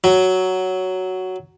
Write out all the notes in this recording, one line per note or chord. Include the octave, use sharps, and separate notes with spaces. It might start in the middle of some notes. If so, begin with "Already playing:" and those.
F#3